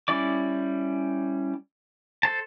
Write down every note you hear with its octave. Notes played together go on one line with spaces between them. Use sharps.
G3 C#4 E4 D5 D6
A4 C5 A5